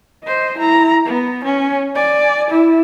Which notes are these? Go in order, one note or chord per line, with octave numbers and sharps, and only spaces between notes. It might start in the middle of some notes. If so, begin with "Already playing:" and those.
C5 D#5
E4 A#5
B3
C#4
D5 G#5
E4